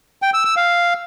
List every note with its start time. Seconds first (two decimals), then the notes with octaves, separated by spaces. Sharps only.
0.22 G5
0.34 E6
0.45 E6
0.57 F5